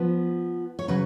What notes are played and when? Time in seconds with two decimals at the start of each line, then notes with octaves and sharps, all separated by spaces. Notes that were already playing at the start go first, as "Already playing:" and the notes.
Already playing: F3 B3
0.79 C#5
0.88 C#3 F#3 C#4 B4